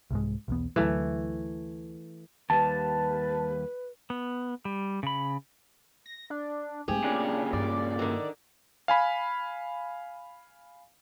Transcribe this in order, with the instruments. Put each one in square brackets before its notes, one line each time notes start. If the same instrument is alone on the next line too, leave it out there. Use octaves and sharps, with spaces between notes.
[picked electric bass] C2 G#2 G#3
B1 E2 B3
[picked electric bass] D2 F#3 [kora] E3 A3
[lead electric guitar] D#2 G3 [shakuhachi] B4 [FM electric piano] A5
[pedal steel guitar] B3
G3
C#3 B5
[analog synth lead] A#6
D4
[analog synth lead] G#2 [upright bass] A3 C4 [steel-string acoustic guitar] G4 G#4
[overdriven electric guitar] A#2 C#3 [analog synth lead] D4
[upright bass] G2 [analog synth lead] D5
[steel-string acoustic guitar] D3 D#3
[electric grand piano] F5 G#5 B5